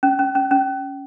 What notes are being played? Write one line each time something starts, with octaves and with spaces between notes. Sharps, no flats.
C#4
C#4
C#4
C#4